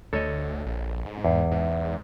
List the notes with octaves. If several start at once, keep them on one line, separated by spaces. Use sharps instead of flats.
D2 A4 C#5 D#5
A#1
G#2
E2
G#2